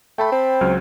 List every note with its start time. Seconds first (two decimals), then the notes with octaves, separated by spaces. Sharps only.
0.18 A3 G5 A5 B5
0.32 C4
0.61 C#2 F#3 F6